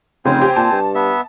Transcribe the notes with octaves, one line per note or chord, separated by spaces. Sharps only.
F1 C#3 C4 C5 G#5
G4
A#2 A5
G2
B3 E5